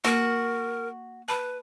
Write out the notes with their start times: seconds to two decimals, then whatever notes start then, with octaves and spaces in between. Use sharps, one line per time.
0.05 A#3 F#4 A#4
1.28 B4 A5 B5